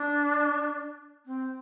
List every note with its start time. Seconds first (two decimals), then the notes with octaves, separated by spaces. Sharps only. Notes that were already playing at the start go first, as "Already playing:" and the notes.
Already playing: D4
1.26 C4